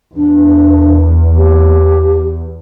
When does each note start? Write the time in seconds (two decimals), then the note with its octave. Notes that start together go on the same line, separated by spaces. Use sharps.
0.17 E2 D4
1.37 G4